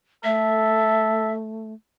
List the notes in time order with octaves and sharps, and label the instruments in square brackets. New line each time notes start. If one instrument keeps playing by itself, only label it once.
[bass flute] A3 [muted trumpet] A4 [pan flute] E5